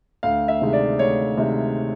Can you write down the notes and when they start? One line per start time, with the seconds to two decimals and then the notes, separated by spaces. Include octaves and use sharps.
0.23 D2 F5
0.48 E5
0.61 C3 D#3 G#3
0.73 D5
0.99 D2 C#5
1.37 C3 D#3 G#3